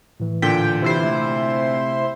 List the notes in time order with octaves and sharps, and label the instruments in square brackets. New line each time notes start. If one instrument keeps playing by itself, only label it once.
[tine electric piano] A2 E3
[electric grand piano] A#2 D3 B6 [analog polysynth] G5
[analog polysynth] C3 E4 C5 [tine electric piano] E3
[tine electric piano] A3